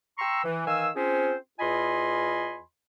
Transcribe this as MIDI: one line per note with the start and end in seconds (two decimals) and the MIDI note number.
0.19 0.41 79
0.19 0.41 82
0.19 0.41 84
0.19 0.41 85
0.19 0.41 88
0.44 0.62 52
0.66 0.89 51
0.66 0.89 52
0.66 0.89 77
0.66 0.89 80
0.66 0.89 88
0.96 1.34 60
0.96 1.34 61
0.96 1.34 65
0.96 1.34 68
0.96 1.34 72
1.59 2.60 40
1.59 2.60 65
1.59 2.60 75
1.59 2.60 80
1.59 2.60 83
1.59 2.60 84